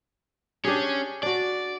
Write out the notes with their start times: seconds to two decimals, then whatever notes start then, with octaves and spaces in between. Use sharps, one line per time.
0.64 C#4 D4 G4 G#4
1.23 D4 F#4 D5